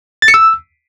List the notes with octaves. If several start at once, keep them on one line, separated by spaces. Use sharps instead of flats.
A6
C#7
E6